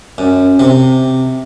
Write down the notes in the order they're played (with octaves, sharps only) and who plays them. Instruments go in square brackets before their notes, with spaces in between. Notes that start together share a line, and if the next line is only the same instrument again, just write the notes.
[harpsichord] F#2
C3